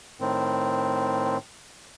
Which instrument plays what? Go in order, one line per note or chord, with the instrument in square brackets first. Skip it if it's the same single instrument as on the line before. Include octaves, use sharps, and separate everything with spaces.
[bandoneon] A2 D#3 C4